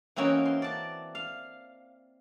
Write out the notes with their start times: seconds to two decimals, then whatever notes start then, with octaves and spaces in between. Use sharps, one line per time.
0.16 E3 A#3 C4 C#4 D#4 F#4
0.46 C6
0.62 D5 A5
1.15 F5